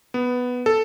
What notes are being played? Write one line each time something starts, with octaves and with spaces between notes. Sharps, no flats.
B3
A4